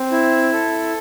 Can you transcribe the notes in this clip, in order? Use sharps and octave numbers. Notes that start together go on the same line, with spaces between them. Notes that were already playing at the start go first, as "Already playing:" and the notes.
Already playing: C4
E4
A4